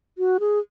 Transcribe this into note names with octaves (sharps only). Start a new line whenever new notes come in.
F#4
G#4